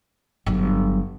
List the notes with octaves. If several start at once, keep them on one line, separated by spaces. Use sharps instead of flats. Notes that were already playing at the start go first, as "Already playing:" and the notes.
G1 F#3